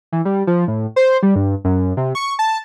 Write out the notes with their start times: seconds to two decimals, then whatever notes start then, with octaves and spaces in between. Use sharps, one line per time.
0.12 E3
0.25 G3
0.47 F3
0.68 A2
0.96 C5
1.23 G3
1.36 G2
1.65 F#2
1.97 C3
2.15 C#6
2.39 A5